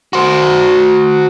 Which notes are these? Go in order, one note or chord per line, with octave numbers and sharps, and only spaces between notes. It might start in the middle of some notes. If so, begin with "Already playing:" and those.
F#4 C5